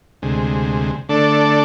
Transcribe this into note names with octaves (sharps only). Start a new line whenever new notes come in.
D2 C3 G#3
D3 A3 D4 A4 D5